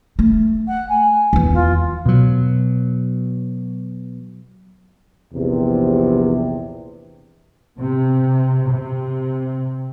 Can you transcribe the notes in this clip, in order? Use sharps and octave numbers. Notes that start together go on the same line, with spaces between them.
A3
F#5
G#5
E2 E3
F4
B2 F#3
A#1 E2 C3
C3
C3